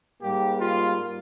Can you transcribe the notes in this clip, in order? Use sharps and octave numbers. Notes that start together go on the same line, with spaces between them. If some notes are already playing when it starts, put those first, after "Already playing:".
G#2 G3 A#3 G4
F4